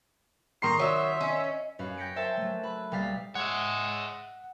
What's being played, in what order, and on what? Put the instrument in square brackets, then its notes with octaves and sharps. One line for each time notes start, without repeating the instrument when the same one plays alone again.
[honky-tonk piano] D#3 C6 C7 [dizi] A#5 [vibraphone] C#6 D#6
[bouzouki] F#3 [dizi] E5
[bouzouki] C#4 [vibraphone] D#5
[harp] F#2 C#4 B4 F5
G5 G6 A#6 B6 C#7 D7
A#4 C5 C#5 E5 G5 A5
F#3 A3
B4 B5
B1 G3 A#3 F5 A6 B6
[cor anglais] G#3 [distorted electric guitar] C#5 E5 [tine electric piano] F#5